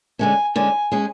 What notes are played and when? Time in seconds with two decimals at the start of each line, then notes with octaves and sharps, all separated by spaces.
0.19 D3 G#3 C#4 G#5
0.55 D3 G#3 C#4 G#5
0.92 G#3 C#4 G#4